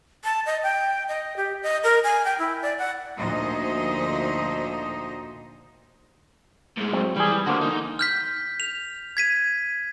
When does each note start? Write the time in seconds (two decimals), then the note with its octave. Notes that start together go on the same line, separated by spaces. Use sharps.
0.24 A5
0.46 D#5
0.63 G5
1.08 D#5
1.37 G4
1.62 D#5
1.84 A#4
2.03 G#5
2.25 G5
2.39 E4
2.62 D5
2.78 F#5
3.18 D2 A#2 F3 D#4 C5 D#5
6.77 A2 G#3
6.93 F#3 C4
7.16 E3 G3 G#4
7.32 E3
7.46 D3 A#3 F#4 C5
7.61 D#4
7.99 F6 G6 B6
8.60 F7
9.17 G#6 B6 D#7